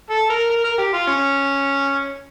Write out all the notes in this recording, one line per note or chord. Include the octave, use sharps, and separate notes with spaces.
A4
A#4
A#4
A#4
G4
F4
C#4